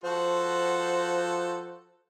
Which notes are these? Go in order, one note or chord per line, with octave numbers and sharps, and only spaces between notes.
F3 F#4 A4 C5 F#5